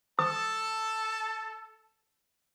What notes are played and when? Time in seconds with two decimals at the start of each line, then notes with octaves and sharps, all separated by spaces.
0.19 A4 A5 D#6